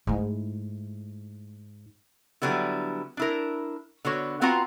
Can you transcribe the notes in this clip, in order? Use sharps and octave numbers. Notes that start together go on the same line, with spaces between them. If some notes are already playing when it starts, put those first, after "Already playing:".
G#2 A3 E4
D3 F#3 G3 B3 E4
D4 E4 A#4
D3 B3 F#4 C#5
B3 C4 F4 F#4 F#5 A#5